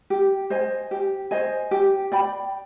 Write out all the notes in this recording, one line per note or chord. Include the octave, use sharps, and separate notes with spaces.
G4
C5 D#5 G#5
G4
C5 D#5 G#5
G4
D5 G5 B5